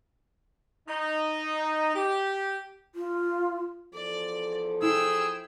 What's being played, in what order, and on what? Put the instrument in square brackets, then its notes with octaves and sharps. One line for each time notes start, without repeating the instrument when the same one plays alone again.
[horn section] D#4
G4
[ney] F4
[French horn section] E2 F3 A4 [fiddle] D5
[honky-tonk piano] E4 [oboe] G#4 [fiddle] G5 E6